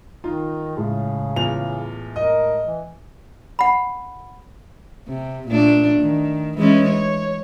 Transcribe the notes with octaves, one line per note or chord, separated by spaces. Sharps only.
D#3 D#4 F4
A2 C#3 G#3
E2 F4 F7
A#4 D#5
E3
F#5 B5
C3
A#2 A3 D4
D#3
E3 G#3 C#4
C#5